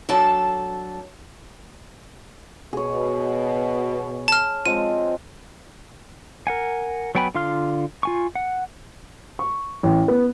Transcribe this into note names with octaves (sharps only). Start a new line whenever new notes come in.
F#3 D4 A4 A5
B2 G#4 C#5
A5 F6
F3 G#3 C4 D#7
A#4 F#5 G#5
F#3 B3 G5 G#5 B5
D3 F4 F5 C6 F6
F4 G#5 C#6
F#5
C#6
A1
B3